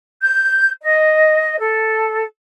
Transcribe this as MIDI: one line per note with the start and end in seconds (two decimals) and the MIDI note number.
0.21 0.70 91
0.82 1.58 75
1.59 2.24 69